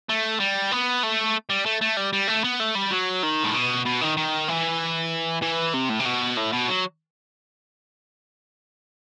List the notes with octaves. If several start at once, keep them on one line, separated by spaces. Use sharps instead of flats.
A3
G3
B3
A3
G3
A3
A3
G3
G3
A3
B3
A3
G3
F#3
D#3
A2
B2
B2
D#3
D#3
E3
E3
C3
A2
C3
B2
A2
B2
F#3